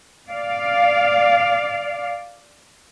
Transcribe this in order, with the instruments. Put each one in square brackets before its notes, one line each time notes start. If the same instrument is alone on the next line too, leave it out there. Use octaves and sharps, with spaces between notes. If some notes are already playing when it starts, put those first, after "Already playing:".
[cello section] D5 F5